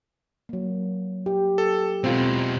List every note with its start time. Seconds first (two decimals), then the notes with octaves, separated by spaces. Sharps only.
0.49 F#3 A#3
1.26 G4
1.58 A4
2.04 B2 G#3 C4 F4